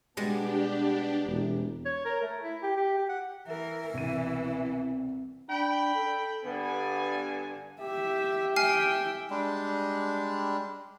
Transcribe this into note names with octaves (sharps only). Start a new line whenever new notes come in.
B2 G3 G#3 B3 D4 G4 A5
E1 C3 E3 A#5
C#5
A#4
A3
E4
G4
G4
G4
F#5
E3 A#4 E5
C2 B2 E3 D#7
D4 G5 B5
A4
G2 D3 B3 G#5
G4 E5
E5 G5 G#5 F6 C7
G3 G#3 D4